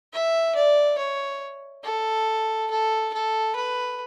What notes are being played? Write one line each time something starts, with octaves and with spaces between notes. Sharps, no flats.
E5
D5
C#5
A4
A4
A4
B4